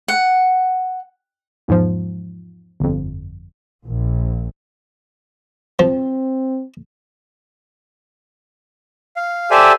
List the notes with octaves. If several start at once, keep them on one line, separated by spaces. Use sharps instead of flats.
F#5
E2 G#2 F3
G1 F2
A#1
F3 C4
F5
G4 A4 C5 D5 E5 G#5